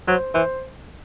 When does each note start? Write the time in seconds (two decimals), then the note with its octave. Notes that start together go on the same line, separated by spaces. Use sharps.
0.07 F#3 C5
0.34 E3 C5